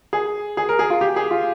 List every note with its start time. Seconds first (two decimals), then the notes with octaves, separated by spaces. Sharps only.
0.13 G#4
0.57 G#4
0.69 A#4
0.79 G#4
0.90 F4
1.01 G4
1.16 G#4
1.31 F4